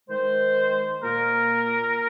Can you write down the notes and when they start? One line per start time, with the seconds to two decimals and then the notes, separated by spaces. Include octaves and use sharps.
0.09 D#3 G#3 C5
1.03 A#2 A#3 A#4